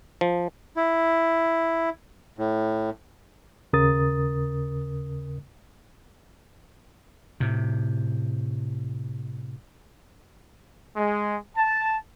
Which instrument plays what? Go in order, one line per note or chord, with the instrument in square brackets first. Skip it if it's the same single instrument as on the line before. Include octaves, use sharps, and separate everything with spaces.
[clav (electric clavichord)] F3
[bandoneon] E4
A2
[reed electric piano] D#2 C#3 A#4 D#6 A6
[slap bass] A2 C3
[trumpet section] G#3
A5